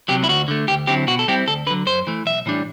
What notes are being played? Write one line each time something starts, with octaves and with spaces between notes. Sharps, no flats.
C3 F#3 G4
E4
D2 F#4
D3 A3
D2 G4
D3 F#3 C4 E4 G4
B2 F#4
A4
G3 C4 E4 G4
D2 A4
D3 F#3 B4
F#2 C5
E3 A3
B1 E5
A2 E3 G3 D4